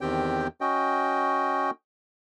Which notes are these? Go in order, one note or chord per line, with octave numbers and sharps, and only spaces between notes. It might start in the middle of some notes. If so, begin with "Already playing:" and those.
E2 D#3 C4 G4 G5
C#4 F#4 D#5 G5